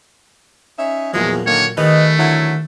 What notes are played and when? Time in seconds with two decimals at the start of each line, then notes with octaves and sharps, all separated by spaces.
0.79 C#4 D#4 E5
1.14 E2 A#2 F3 F#3 G#3
1.46 D3 D#3 A#3 C#5
1.77 D#3 A3 C#4 G4 B4 D#5
2.18 D3 F#3 E4